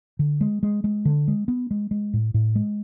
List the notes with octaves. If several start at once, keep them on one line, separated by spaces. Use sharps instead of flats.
D3
G#3
G#3
G#3
D3
G#3
B3
G#3
G#3
A2
A2
G#3